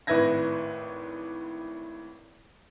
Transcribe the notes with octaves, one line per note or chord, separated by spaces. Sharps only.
G#1 A2 B4 E5 G#6 A#6